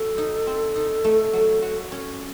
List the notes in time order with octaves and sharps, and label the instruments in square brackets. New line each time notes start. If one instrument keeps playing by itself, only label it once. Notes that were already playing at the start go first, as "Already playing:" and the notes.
Already playing: [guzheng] F#3 [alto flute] A4
[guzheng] D#4
C4
D#4
A3
F#3
F#4
C#4